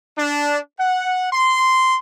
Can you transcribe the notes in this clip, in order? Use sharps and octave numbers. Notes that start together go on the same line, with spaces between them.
D4
F#5
C6